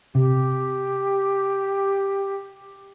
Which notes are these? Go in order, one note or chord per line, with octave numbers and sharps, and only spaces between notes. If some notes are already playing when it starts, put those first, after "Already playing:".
C3 G4